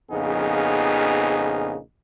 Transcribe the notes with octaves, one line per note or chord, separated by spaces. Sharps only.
A#1 F2 C#3 B3 D#4 G#4